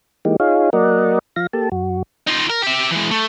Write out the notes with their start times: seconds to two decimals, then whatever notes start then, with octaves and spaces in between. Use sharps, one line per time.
0.25 E3 G#3 A#3 D#4 G4
0.40 D#4 F4 G#4 C#5 F5
0.73 F#3 A#3 A#4 D5 D#5 F#5
1.36 F3 F5 A#6
1.53 A#3 G4 A4 A5
1.72 F#2 F#4
2.27 D#4 F4
2.50 A#4
2.62 G4 E5
2.91 E3 G#3
3.11 A3